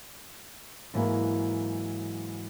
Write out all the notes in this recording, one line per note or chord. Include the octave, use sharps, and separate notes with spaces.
G#2 E3 F#3 A#3